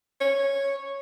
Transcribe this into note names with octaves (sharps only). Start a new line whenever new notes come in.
C#5